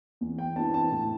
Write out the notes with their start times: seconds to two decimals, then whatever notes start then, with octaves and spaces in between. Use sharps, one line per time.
0.21 E2
0.38 G5
0.56 C3 E3 B3 D4 A5
0.74 A5
0.91 A2